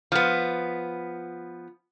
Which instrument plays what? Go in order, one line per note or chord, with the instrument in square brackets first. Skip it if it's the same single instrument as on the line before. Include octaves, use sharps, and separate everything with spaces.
[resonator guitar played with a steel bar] F3 B3